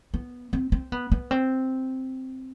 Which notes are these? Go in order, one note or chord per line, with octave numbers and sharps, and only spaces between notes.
B3
C4
C4
B3
B3
C4